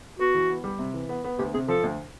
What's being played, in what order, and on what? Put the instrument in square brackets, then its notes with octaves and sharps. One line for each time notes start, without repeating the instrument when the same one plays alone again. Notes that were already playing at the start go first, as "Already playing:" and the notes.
[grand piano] B3 [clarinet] F#4
[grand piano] E3
B3
G3
C3
E3
B3
B3
[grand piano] D2 [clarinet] G4
[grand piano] C3 [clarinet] G#4
[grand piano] F3 [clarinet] A4
[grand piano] D2